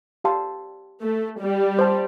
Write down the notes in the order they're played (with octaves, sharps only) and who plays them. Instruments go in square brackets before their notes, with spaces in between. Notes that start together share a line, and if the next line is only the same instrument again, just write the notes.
[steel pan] G4 F5 A5 C6
[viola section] A3
G3
[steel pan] C5 A5 C6